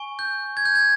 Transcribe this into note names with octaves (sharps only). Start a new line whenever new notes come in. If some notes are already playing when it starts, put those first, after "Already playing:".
Already playing: G#5 C#6
G6
G#6
G6
G#6